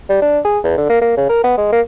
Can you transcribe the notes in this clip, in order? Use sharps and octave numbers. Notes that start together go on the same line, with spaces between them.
G3
D4
G#4
E2
D3
A#3
A#3
C#3
A#4
B3
G#3
A#3